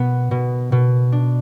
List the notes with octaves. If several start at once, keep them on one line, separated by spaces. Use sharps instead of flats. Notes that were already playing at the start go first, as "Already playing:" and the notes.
Already playing: B2 B3
B2
B2
D4